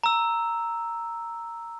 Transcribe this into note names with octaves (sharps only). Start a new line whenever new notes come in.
A#5 E6